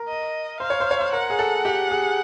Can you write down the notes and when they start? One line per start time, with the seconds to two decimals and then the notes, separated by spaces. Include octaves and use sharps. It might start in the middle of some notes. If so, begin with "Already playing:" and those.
Already playing: A#4
0.08 D#5
0.60 C5 F5
0.70 C#5
0.80 C5
0.91 C#5
1.00 C5
1.13 A#4 F#5
1.30 G#4
1.39 A4
1.65 G4
1.91 G#4